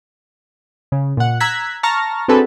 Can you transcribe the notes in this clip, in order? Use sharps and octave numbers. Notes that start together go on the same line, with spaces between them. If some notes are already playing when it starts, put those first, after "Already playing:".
C#3
A#2 F#5
A#5 E6 F#6 G#6 B6
A5 A#5 C#6 F6 A#6
C4 D4 F#4 G#4 A4 B4